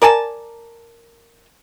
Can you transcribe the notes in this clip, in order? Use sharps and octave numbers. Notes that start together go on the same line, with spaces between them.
A#4 D5 G#5 A5